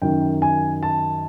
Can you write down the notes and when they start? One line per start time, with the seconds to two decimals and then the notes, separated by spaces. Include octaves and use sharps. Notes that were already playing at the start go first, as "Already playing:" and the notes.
0.02 F#2 D#3 G5
0.42 G#5
0.83 A5